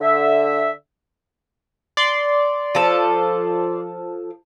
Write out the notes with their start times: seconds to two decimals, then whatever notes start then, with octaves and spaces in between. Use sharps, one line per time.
0.01 D3 E5
1.97 D5 C6
2.75 F3 A4